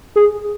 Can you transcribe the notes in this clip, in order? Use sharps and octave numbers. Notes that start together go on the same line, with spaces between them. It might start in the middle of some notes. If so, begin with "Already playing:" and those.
G#4